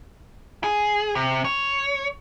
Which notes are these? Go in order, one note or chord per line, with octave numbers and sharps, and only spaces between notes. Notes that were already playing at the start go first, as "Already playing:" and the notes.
G#4
C3
C#5